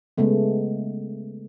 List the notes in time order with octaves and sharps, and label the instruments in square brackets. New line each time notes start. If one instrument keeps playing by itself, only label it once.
[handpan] C#3 G#3 A3 B3